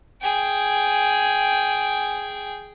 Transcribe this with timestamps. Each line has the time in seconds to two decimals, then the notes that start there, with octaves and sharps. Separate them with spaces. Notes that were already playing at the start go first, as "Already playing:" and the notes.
0.22 G#4 G5